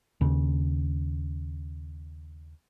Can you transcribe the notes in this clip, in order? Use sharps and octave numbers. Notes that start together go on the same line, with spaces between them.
D#2 C#3